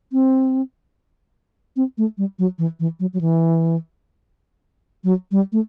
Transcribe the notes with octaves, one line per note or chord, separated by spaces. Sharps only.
C4
C4
A3
G3
F#3
E3
E3
F#3
F#3
E3
F#3
G3
A3